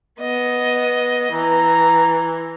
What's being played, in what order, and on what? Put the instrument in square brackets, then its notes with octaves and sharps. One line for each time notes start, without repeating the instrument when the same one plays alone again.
[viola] B3 D#5
[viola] E3 [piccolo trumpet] A#5